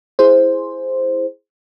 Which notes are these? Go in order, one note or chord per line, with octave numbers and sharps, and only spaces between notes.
E4 G#4 C5